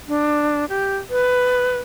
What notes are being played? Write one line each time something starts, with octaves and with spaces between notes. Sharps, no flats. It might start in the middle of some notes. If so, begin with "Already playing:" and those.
D4
G4
B4